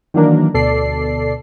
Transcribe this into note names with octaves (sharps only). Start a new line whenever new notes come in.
D#3 E3 F#3 A#3 D4 A#4
D2 B2 A4 D5 C7